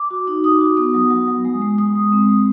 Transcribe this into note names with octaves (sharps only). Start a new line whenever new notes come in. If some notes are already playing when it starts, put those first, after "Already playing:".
Already playing: D6
F#4
D#4
D#4 D#6
F#4
B3 D#6
F#3
F#3
F#3
G#3
G#3
G#3 D#6
G#3
C4
G#3